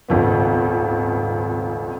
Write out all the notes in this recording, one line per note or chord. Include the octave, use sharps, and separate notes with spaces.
D#1 G#1 C#2 B3